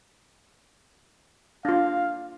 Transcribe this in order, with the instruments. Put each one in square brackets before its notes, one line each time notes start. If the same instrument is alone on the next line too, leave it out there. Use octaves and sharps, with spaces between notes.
[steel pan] D4 F4 [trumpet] F5